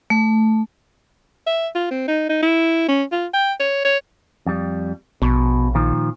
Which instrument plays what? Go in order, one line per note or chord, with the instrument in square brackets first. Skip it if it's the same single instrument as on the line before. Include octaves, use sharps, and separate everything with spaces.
[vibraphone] A3
[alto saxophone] E5
F4
C4
D#4
D#4
E4
C#4
F4
G5
C#5
C#5
[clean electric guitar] F2 G3
[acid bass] A#1 [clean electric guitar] B2
[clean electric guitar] A#2 D#3 F3